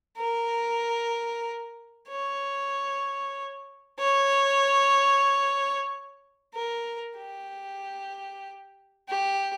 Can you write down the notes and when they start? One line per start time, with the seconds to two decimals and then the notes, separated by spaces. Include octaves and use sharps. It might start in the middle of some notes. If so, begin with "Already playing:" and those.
0.17 A#4
2.09 C#5
3.99 C#5
6.54 A#4
7.17 G4
9.08 G4